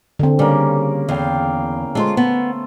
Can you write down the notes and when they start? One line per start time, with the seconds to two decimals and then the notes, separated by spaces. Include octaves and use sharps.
0.19 D3 C4
0.39 C#3 G3 A#3
1.09 E2 F5 G5
1.95 G#3 A3 F4 C5
2.17 B3